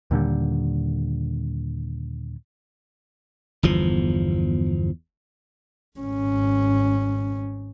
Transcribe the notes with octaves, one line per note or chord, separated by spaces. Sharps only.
D#2 A#2 D3 G3
G1 E2 F3
G#1 C#4